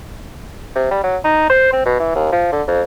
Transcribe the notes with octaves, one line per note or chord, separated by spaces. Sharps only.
C3
G3
F#3
D#4
C5
C4
B2
E3
D#2
F3
D3
F2